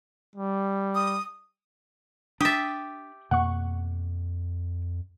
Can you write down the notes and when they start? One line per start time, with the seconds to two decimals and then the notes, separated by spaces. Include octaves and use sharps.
0.36 G3
0.95 D#6
2.41 D4 G4 E5 D#6 A6
3.31 F2 B2 A#3 F#5 C#6